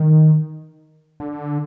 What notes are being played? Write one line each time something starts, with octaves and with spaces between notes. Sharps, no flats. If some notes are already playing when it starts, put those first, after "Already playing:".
Already playing: D#3
D3